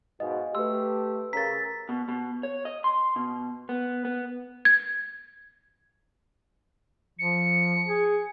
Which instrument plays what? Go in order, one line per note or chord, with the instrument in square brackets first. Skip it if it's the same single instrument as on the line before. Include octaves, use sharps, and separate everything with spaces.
[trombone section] G#2 B2 [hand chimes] D#5 F5 G#5
[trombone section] A3 G4 [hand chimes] B4 C6 [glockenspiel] E6
[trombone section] C#3 [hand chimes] A#4 A#5 [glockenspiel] A6 B6
[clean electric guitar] B2
B2
C#5
D#5
C6
B2
B3
B3
[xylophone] G#6
[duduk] F3 [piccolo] C#7
[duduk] G#4